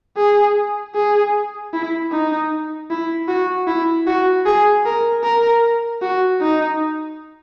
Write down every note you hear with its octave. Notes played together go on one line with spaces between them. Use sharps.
G#4
G#4
E4
D#4
E4
F#4
E4
F#4
G#4
A#4
A#4
F#4
D#4